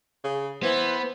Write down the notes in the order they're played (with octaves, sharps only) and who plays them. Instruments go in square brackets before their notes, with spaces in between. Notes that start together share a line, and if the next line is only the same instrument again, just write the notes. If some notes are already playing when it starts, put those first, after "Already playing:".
[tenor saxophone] C#3
[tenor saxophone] E3 [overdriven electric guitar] B3 [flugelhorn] C5